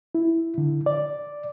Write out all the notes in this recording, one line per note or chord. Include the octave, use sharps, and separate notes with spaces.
E4
D3
D5